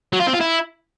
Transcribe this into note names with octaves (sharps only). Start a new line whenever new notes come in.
F#3
F4
C4
F4
E4